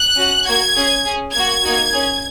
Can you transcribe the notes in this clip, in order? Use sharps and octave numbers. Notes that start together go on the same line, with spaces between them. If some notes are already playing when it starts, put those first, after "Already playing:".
Already playing: F#6
C#4 F#4
A#3 F#4 G#6
C#4 G#4
C#4 G#4
A#3 F#4 G#6
A#3 D#4 F#4
C#4 G#4